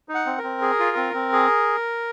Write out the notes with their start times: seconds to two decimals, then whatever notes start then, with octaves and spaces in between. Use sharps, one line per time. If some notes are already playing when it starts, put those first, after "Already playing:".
0.09 D#4
0.14 F#5
0.26 C4
0.38 A#4
0.43 C4
0.62 G#4
0.79 F4
0.97 C4
1.14 C4
1.33 G#4